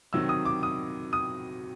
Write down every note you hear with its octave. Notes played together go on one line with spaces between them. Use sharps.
C3 D#3 F#3 E6
D#6
D6
D#6
D#6